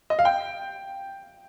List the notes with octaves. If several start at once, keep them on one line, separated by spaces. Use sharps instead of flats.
D#5
F5
G5